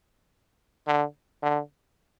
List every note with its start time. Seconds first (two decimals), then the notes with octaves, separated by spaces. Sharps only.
0.87 D3
1.43 D3